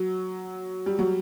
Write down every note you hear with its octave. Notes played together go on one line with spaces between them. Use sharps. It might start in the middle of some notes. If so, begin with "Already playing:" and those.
Already playing: F#3
G3
F#3